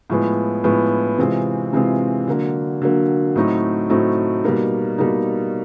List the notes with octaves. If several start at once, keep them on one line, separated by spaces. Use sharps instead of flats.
A2 F3 G#3 B3
A2 F3 G#3 B3
C3 E3 G#3 C4 F4
C3 E3 G#3 C4 F4
D3 F#3 A#3
D3 F#3 A#3
A2 F#3 A3 C4 D#4
A2 F#3 A3 C4 D#4
B2 G3 A#3 D#4
B2 G3 A#3 D#4